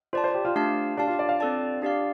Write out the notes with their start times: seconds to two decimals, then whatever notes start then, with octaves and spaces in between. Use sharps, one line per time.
0.13 F4 C5 D5 A5
0.24 C5
0.34 G4
0.45 F4
0.56 A3 D4 G4 F5 A5
0.97 D4 G4 F5 A5
1.08 F4
1.19 D5
1.29 F5
1.40 C4 A4 D5 A5
1.82 D4 G4 D5 F5